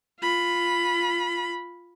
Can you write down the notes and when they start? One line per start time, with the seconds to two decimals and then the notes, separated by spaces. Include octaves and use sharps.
0.20 F4 B5